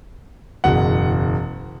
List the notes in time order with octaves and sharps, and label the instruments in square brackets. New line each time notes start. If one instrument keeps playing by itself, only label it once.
[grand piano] F#1 E2 B2 F#5